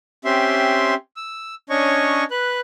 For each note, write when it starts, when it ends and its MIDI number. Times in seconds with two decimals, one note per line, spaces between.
0.25 0.94 60
0.25 0.94 61
0.25 0.94 67
0.25 0.94 76
0.25 0.94 84
1.17 1.55 88
1.70 2.24 61
1.70 2.24 62
1.70 2.24 73
1.70 2.24 75
1.70 2.24 85
2.31 2.60 71
2.31 2.60 90